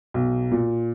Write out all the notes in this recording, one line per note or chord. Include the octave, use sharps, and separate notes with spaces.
B1
A#2